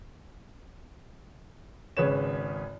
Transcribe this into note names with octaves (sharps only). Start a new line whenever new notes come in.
G#1 C#3 B4 C#5 E7